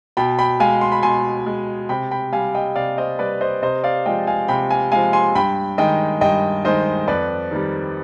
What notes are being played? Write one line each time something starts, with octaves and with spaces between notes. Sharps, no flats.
B2 G5 B5
G5 B5
G#3 F5 G#5
C6
B5
B2 G#5 C6
G#3
C3 G5 B5
G5 B5
G3 F5 G#5
D#5 G5
C3 D5 F5
C5 D#5
G3 B4 D5
C5 D#5
C3 C5 D#5
D5 F5
F3 G#3 D#5 G5
F5 G#5
C3 G5 B5
F5 G#5
F3 G#3 F5 G#5
G#5 C6
G2 G5 B5
D#3 G#3 D#5 G5
G2 D#5 G5
D#3 G#3 C5 D#5
F2 B4 D5
D#3 G3